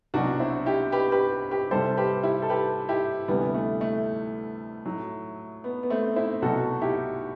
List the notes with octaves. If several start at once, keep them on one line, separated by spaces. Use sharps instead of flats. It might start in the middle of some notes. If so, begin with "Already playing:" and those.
C2 B2 F#3 D4 F#4
C4 E4
E4 G4
G4 B4
G4 B4
G4 B4
C2 C3 G3 A4 C5
G4 B4
E4 G4
A4
G4 B4
E4 G4
D2 C3 E3 G3 B3
A3
A3
A2 F#3
B3
B3
A3 C4
C4 E4
C2 B2 F#3 F#4 A4
E4 G4